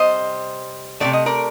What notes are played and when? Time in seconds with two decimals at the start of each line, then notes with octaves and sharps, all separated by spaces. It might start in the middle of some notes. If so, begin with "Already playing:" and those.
Already playing: C3 G3 C5 D#5
1.00 C3 F#3 A3 D5
1.13 D#5
1.26 A#4 D5